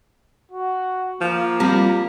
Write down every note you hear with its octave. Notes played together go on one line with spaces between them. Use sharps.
F#4
F3 A#3
G3 C4 F4